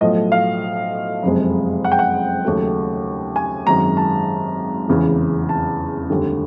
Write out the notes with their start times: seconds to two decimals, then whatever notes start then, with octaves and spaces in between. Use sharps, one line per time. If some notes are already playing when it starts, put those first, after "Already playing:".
0.01 B1 A2 F3 A3 D#5
0.32 F5
1.23 F#1 F2 C3 F3 G#3
1.85 F#5
1.92 G5
1.99 F#5
2.45 D#2 C#3 F#3 A3
3.36 G#5
3.67 G#1 F#2 D#3 G#3 A#5
3.97 A5
4.88 F1 E2 C#3 E3
5.49 A5
6.10 F1 D#2 D3 G3